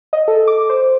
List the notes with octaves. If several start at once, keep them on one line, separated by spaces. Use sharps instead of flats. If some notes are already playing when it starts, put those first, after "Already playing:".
D#5
A4
D6
C5